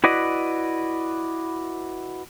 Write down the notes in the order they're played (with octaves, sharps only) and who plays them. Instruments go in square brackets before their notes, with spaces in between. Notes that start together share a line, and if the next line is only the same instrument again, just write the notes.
[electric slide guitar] E4 F#4 B4 D5 D#5